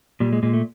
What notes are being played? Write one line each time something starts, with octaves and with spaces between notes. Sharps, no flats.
A#2 G3
G#3
A#2 G#3
A3